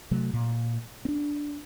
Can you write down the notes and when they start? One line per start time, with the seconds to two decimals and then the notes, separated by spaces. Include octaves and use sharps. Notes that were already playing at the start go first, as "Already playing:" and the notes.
0.11 C3 F#3 A3
0.34 A#2
1.05 C4 D4